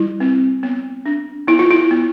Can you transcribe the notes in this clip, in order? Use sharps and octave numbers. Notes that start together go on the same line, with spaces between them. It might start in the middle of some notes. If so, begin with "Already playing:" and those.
Already playing: G3 E4
C4
B3
D4
B3 E4
F4
E4
B3